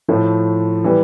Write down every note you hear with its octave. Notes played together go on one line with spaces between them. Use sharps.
A2 F3 A3
E3 G3